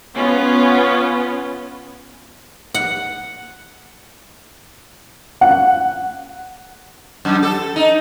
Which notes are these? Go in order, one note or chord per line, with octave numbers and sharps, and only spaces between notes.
B3 C#4 F4
F#5
F#5
F#2
A4
D#4